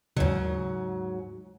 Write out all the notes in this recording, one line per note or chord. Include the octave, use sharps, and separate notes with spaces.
D#2 G#2 C#3 F#3